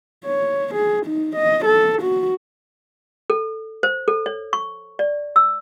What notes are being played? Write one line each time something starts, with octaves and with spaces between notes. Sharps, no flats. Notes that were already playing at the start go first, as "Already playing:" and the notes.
C#5
G#4
D#4
D#5
A4
F#4
A4
C5
A4
C#5
C#6
D5
E6